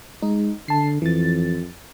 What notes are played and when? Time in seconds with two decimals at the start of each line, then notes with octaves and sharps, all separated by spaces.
0.22 G#3 D#4
0.68 D3 A5 C7
1.02 F2 E3 A6